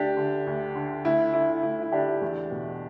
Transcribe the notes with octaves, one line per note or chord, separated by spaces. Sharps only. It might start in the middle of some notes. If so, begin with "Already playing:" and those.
Already playing: D2 D4 G4
D3
D2
D3
D2 E4
D3 E4
D2 E4
E4
D3 D4 G4
E2
B2